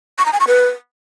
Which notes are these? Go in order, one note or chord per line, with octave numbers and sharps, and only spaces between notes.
C#6
A#5
G#5
C#6
B4